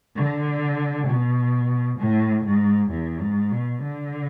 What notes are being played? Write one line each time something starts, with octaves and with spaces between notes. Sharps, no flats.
D3
B2
A2
G#2
E2
G#2
B2
D3